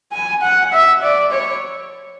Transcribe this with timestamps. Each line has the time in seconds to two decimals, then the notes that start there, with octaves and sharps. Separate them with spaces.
0.12 G#5
0.42 F#5
0.73 E5
1.03 D5
1.32 C#5